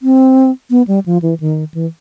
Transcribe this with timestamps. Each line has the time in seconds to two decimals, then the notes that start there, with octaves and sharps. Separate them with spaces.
0.02 C4
0.70 B3
0.87 G3
1.06 F3
1.22 E3
1.40 D#3
1.74 E3